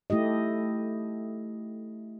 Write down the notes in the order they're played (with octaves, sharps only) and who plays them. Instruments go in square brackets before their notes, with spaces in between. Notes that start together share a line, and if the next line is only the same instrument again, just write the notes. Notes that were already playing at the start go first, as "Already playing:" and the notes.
[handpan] A3 E4 G4 D#5